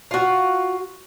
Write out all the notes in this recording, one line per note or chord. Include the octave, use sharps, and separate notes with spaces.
F4 F#4